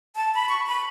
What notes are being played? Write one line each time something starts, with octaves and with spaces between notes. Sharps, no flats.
A5
B5
C#6
B5